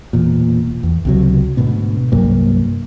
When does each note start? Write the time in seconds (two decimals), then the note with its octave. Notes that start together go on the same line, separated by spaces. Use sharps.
0.13 E1 E2 A#2
0.83 E2
1.05 C#2 C3 F#3
1.57 D2 G#2 B2 B3
2.12 C2 G2 F#3 A#3